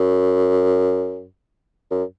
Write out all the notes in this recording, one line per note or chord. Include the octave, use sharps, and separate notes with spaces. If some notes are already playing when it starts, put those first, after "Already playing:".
Already playing: F#2
F#2